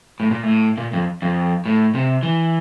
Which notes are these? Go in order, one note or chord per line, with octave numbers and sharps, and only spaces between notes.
A2
A#2
A2
A#2
F2
F2
A2
C3
E3